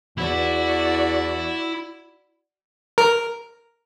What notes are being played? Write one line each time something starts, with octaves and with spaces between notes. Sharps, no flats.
E2 E4 F#4 D5
A#4